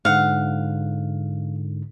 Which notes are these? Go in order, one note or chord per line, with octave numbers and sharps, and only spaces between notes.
G#2 D3 F5 F#5